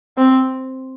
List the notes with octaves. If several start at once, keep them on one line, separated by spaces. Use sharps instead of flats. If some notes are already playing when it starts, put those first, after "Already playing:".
C4